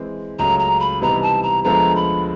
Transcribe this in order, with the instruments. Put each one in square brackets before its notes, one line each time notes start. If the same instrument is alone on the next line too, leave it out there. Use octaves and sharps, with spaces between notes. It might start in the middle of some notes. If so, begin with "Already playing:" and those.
Already playing: [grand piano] E3 G#3 C4
[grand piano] C#2 C#3 F#3 A3 [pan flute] A#5
[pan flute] A#5
B5
[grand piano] C3 E3 G3 B3 D#4 [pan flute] A#5
[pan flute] A5
A#5
[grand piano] D2 D3 F3 G#3 B3 [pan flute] A#5
[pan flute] B5